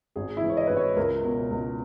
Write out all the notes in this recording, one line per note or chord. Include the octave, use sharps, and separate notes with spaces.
G#1 G#4
E4
E3
C#5
D#5
G#1 B4
C#5
C#2 A#4
B2
C#2